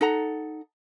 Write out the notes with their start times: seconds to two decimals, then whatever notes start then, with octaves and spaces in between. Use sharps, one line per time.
0.01 D#4 A4 F#5 A#5